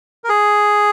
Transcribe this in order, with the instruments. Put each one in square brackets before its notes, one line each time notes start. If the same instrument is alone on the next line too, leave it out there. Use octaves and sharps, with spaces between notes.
[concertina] A#4
G#4